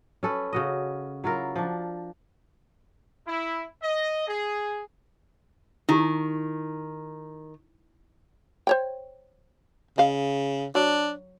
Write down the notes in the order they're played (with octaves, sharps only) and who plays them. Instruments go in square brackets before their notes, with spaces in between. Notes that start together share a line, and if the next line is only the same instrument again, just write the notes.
[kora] C#4 A4 B4
C#3 F#4 D#5
F#3 E4 F4 A#4
F3 D4
[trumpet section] E4
D#5
G#4
[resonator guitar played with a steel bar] D#3 [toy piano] D#4 E4 G4
[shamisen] C5 C#5 G5
[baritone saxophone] C#3 [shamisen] D#5 F5
[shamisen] F#3 [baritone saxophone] D4